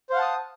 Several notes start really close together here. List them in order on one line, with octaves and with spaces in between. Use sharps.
C5 F5 F#5 A5 D#6